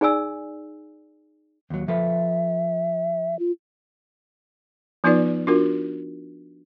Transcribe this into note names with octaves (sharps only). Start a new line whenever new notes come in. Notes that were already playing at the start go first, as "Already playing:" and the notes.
D#4 G#4 D5 G#5 E6
D#2 F#3
F3 A4 B4 E5
F4
F3 B3 D#4 F4 B4 D5
D4 F4 F#4 A#4